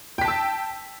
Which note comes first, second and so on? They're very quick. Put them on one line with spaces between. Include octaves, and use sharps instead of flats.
G5 B6 A5 E6